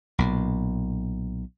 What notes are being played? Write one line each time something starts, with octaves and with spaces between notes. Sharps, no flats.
B1 A#2